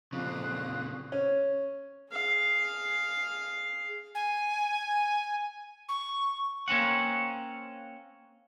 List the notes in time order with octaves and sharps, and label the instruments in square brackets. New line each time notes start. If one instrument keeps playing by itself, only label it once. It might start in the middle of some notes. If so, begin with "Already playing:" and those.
[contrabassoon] F2 [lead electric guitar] A#2 C#3 [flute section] F5 D#6 F#6
[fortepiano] C#4
[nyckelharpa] G#4 F5
[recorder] G#5
C#6
[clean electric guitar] A#3 C4 C#4 F#5